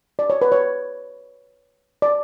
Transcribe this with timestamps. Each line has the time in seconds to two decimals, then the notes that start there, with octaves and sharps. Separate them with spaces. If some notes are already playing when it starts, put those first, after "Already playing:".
0.19 D5
0.30 C#5
0.42 B4
0.52 C#5
2.02 D5